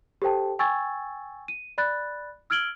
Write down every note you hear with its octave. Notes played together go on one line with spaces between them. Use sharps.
G4 A4 C5 G5 A5
G5 G#5 C#6 E6 G#6 A6
D#7
D5 B5 F#6 A6
E6 F6 G#6 D7 F#7 G7